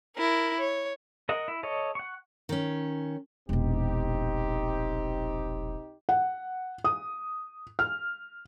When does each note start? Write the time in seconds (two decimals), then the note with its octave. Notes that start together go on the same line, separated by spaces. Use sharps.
0.16 E4 A#4
0.60 C#5
1.29 A#4 D#5 F#5
1.48 E4
1.63 A4 C#5 D#5
1.95 F#5 C#6
2.49 D#3 C#4
3.49 E1 A#1 C4 D#4 G4
6.09 F#5
6.84 D#6
7.79 F6